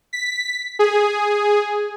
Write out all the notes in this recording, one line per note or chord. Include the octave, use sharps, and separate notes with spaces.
B6
G#4